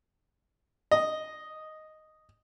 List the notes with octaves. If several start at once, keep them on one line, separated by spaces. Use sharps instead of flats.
D#5